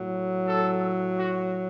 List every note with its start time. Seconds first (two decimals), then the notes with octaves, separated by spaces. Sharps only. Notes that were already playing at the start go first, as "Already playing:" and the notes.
Already playing: A2 F#3
0.48 A4
1.19 F#4